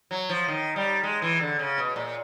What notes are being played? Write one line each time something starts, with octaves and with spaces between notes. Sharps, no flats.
F#3
F3
D#3
G3
G#3
E3
D3
C#3
B2
A#2